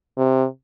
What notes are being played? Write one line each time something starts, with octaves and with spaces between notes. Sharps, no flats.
C3